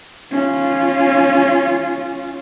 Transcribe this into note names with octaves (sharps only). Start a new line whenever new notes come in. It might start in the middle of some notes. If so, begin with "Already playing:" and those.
C#4 F4